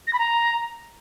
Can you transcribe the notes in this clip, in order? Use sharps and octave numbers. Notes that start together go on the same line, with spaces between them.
A#6
B5
A#5